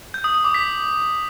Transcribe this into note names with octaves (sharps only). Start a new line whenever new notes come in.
G6
D#6
D#6
D6
B6